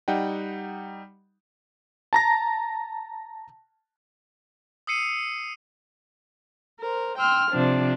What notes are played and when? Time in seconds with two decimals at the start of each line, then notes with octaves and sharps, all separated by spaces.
0.08 G3 D#4 F#5 G5
2.13 A5 A#5 A#6
4.87 D#6 E6 C7 C#7 D#7
6.82 A#4 C5
7.18 G5 C6 E6 F6
7.50 C3 F3 C4 D4